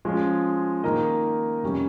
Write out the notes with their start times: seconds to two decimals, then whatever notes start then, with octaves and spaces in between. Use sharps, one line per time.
0.05 F3 G#3 C#4 F4 G#4
0.84 D#3 A#3 D#4 A#4 D#5
1.63 F2 C3 G3 C#4 G4